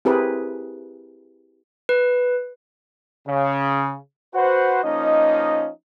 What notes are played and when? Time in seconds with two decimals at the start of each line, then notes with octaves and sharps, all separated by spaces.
0.05 C4 E4 G4 G#4 A#4 B4
1.89 B4
3.28 C#3
4.34 F#4 B4 C5 F#5
4.84 F3 A#3 C#4 D#4 D#5